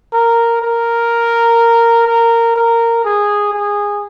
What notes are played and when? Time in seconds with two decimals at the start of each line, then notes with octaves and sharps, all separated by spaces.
0.14 A#4
0.62 A#4
2.07 A#4
2.56 A#4
3.05 G#4
3.53 G#4